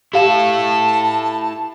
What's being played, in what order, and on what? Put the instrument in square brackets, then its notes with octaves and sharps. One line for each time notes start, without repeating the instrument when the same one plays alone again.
[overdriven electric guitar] E4 A4 [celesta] G4 F5 E7 [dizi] A5